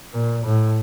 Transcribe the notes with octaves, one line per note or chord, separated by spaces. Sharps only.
A#2
A2